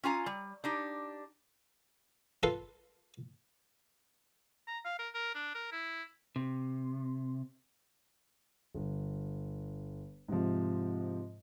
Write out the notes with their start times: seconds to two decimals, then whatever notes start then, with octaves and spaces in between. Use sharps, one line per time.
0.03 C#4 F4 G#5 A#5
0.26 G3
0.64 D4 D#4 G4
2.43 F4 A4 B4 F5
4.67 A#5
4.85 F5
4.99 A#4
5.14 A#4
5.35 D4
5.55 A#4
5.72 E4
6.36 C3
8.75 G1
10.28 G#2 C3 F3